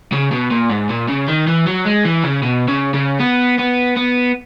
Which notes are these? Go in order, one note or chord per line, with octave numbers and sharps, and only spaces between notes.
C#3
B2
A#2
G#2
A#2
C#3
D#3
E3
F#3
G#3
E3
C#3
B2
C#3
C#3
B3
B3
B3